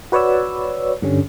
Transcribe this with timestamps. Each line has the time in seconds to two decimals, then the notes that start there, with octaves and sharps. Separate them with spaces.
0.12 F#4 B4 C#5 D5 E6
1.02 G2 D3 G3 C#4